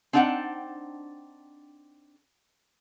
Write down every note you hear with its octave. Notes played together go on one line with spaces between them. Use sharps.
C4 D4 D#4 F#5 G5 A5